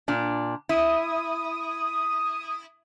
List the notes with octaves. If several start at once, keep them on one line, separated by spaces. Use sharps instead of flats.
A#2 D4
E4 D#6